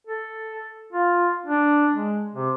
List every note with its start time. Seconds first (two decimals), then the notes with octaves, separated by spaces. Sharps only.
0.07 A4
0.93 F4
1.46 D4
1.93 G#3
2.34 C3